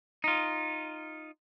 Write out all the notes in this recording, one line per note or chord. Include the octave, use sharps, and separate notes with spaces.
D#4 F4